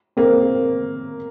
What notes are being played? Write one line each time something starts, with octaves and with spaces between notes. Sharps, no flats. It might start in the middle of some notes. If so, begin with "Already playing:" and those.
A#3 C4